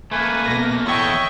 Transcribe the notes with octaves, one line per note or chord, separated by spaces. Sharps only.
A3 A#3 B4 G#5
B2 A#6
E2 E4 A4 C#5 D#5 E5 G5 C#6